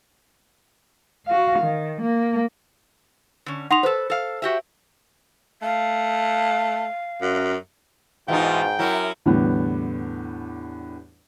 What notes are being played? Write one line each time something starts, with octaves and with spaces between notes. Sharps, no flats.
F#4 F5
D#3
A#3
D3 C#4
D#4 F#5 C6 F7
A4 B4 C5
A4 F5
F#4 G4 E5
A3 F5
F#2
G#2 B2 E3 D#4 F4 G5
F#2 F#3 E4 A#4
E2 A2 D3 G3 B3 D4